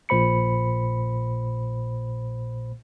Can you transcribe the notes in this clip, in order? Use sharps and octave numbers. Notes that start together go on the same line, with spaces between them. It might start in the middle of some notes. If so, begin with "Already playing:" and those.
A#1 A#2 C5 B5 C#7